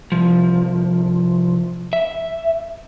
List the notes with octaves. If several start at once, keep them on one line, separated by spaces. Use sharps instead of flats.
C2 F3
E5